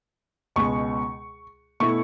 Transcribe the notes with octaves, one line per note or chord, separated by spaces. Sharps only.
C#2 B2 G#3 C#6
B2 A3 E4 C#6